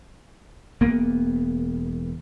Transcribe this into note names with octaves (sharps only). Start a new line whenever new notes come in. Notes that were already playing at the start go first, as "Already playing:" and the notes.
E1 A#3 B3